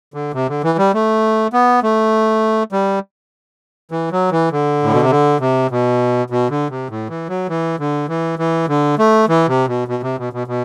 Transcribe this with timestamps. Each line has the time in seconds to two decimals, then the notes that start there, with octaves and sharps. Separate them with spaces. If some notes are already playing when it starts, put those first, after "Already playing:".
0.14 D3
0.34 C3
0.49 D3
0.64 E3
0.78 G3
0.94 A3
1.53 B3
1.83 A3
2.72 G3
3.92 E3
4.12 F#3
4.31 E3
4.52 D3
4.83 A2
4.93 B2
5.02 C3
5.11 D3
5.40 C3
5.70 B2
6.30 B2
6.50 D3
6.70 C3
6.90 A2
7.10 E3
7.29 F#3
7.49 E3
7.79 D3
8.09 E3
8.39 E3
8.68 D3
8.99 A3
9.29 E3
9.48 C3
9.68 B2
9.88 B2
10.03 C3
10.18 B2
10.33 B2
10.47 B2